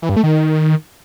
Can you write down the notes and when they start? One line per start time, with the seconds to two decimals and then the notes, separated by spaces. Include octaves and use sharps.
0.02 E3
0.09 G2
0.16 A3
0.24 D#3